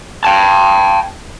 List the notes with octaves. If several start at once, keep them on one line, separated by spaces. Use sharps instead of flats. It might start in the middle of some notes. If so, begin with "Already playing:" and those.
G5 A5